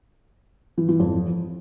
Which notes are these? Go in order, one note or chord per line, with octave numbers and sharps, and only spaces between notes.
E3
E3
F2